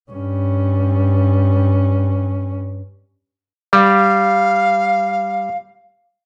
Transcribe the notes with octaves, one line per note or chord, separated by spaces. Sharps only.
G2 C#4
G3 F5